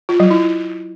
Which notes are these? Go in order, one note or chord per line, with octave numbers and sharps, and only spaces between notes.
F4
F#3
E4